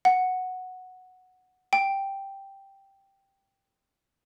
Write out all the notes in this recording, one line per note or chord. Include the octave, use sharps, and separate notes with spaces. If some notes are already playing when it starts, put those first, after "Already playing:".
F#5
G5